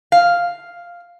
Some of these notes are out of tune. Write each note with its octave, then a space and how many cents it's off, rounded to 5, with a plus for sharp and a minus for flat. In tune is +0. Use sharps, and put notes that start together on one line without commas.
F5 +0